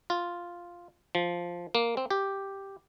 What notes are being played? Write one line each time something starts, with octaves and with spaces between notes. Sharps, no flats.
F4
F3
A#3
C4
G4